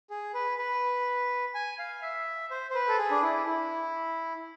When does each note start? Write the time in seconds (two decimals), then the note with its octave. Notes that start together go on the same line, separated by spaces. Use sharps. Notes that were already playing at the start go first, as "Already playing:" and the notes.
0.10 G#4
0.34 B4
0.58 B4
1.54 G#5
1.79 F5
2.02 E5
2.51 C5
2.71 C5
2.75 B4
2.88 A4
2.98 G#4
3.11 D4
3.23 E4
3.47 E4